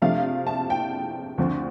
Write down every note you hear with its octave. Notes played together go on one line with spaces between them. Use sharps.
C3 F3 A3 D4 F5
A5
G5
D2 D3 F3 C4